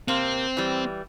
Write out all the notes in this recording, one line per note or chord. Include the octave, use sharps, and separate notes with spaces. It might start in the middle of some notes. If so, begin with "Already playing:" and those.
C3 A#3 C4
E3 G3